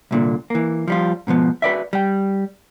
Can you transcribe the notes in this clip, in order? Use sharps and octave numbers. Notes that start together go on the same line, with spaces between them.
C2 A#2 D3
E3 A#3
F3 G3 F4
G#2 B2 F3 B3
F#4 B4 D5 E5
G3 G5